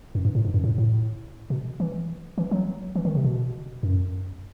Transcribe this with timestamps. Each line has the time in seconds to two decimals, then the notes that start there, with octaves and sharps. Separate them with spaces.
0.15 F#2
0.25 G2
0.35 A2
0.45 G2
0.54 F#2
0.64 A2
0.78 A2
1.50 B2
1.80 E3
2.38 E3
2.51 F#3
2.95 E3
3.05 D#3
3.15 C3
3.24 B2
3.83 F#2